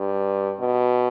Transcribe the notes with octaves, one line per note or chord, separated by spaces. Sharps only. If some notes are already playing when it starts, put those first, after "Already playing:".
Already playing: G2
B2